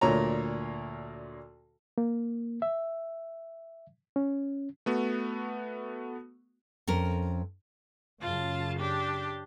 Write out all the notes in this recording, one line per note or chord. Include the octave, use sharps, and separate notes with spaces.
D2 A#2 C#5 A#5
A#3
E5
C#4
A3 B3 F#4
F2 C#4 A#4
F#2 C#3 F4 A5
D4 G4